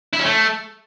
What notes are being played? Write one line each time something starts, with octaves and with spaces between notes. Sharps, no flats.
E4
C#4
A3